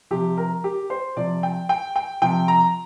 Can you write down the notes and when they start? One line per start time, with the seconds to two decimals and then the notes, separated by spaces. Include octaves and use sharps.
0.11 C3 F3 G4
0.37 A#4
0.64 G4
0.90 C5
1.16 C3 F3 D5
1.43 G5
1.69 G5
1.96 G5
2.22 C3 F3 G5
2.48 A#5